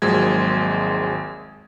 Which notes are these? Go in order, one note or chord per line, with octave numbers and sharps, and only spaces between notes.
G#1 D#2 F3 F#3 G#3 G#6